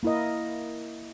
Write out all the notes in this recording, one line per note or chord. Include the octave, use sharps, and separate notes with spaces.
A#3 E4 A#4 D#5